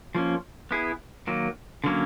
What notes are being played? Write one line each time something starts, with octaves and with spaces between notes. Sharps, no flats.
F3 A#3 C#4
B3 E4 G#4
D#3 F#3 A#3
D3 F#3 A#3 C#4